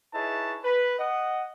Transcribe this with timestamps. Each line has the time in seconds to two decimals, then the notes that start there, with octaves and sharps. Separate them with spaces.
0.14 D#4 E4 G#4 B4 C#5 A5
0.64 B4
0.99 D#5 F#5